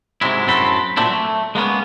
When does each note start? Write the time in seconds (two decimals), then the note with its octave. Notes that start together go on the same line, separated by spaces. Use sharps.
0.21 G#2 C3 F#3 G#3 E4
0.47 F#2 A2 C4 F#4 A4 B5
0.97 A#2 F#3 A3 C4 D4 E4
1.11 A3
1.55 G#3 A#3 B3 C#4